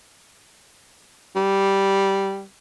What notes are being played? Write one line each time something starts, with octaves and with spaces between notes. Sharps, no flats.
G3